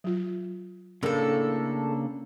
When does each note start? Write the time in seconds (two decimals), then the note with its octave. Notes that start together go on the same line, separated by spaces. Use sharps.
0.04 F#3 F4
1.03 A2 C#3 A#3 D4 A4 A#4